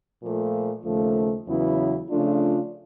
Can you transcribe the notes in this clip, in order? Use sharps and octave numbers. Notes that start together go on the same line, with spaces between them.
A#2 F3 A3
D#2 C#3 F3 A3
E2 C#3 F#3 B3 E4
C#3 F3 A3 D4 F4